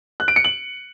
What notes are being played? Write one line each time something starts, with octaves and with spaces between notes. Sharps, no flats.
F#6
D7
C#7
F#7